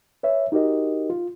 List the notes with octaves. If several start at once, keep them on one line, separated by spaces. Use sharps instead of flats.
B4 C#5 E5
D#4 F#4 G4 A#4 D#5
F4